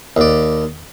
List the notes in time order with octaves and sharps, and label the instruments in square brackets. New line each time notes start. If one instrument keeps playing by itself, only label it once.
[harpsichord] D#2 D5